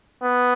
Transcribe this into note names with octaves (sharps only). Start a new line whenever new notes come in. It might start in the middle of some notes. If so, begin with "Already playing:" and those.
B3